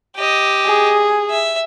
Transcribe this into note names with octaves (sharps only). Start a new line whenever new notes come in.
G4 D#5
G#4
E5